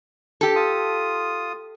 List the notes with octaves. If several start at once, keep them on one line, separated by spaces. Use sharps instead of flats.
G4 A4
F4 D#6